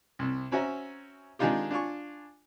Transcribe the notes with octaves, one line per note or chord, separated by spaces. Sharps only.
C2 C3
C4 C#4 F#4 E5 G#5 A#5
D#3 G#3 D4 D#4 F4 G4
D4 F4 G#5 C#6